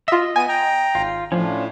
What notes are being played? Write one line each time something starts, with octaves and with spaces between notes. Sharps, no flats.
F4 D#5 E5
B3 G#5 D#7
G5 A#5
G#1 F4
A2 F3 C#4 D4 F4